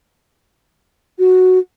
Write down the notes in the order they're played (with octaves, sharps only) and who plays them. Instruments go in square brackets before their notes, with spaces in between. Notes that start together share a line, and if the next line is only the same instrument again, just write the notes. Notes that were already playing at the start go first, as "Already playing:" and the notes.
[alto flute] F#4